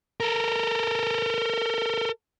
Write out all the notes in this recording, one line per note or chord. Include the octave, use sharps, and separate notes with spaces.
A4 A#4